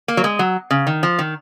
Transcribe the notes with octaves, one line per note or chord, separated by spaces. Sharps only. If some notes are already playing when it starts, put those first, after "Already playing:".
A#3
F#3
G#3
F#3
C#3
D#3
F3
D#3